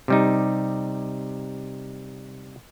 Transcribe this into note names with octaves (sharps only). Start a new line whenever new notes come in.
C3 G3 D#4